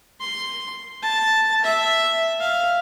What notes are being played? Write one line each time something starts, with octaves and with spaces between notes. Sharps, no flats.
C6
A5
E5
F5